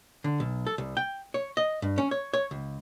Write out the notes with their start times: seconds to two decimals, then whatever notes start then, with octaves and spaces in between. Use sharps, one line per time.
0.24 D3
0.40 B1
0.67 A4
0.78 C2
0.97 G5
1.34 C#5
1.57 D#5
1.82 G2
1.98 C#4
2.11 C#5
2.34 C#5
2.51 C#2